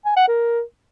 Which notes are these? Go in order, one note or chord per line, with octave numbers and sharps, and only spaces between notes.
G#5
F#5
A#4